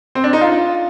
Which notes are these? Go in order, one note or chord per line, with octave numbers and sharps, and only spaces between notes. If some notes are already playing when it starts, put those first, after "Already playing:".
C4
D4
D#4
F4